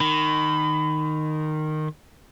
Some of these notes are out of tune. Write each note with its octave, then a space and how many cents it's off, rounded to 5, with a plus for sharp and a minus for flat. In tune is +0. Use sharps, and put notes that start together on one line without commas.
D#3 -15 B5 +25